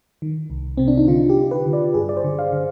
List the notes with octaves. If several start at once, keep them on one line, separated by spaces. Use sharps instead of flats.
D#3
C2
C3 C4
D4
D#4
D3 F4
G4
D3
B4
D3
D5
G2 G#4
D5
C5
D3
F5
D3